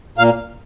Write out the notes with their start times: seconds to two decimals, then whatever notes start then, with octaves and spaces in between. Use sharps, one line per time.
0.18 A#2 F5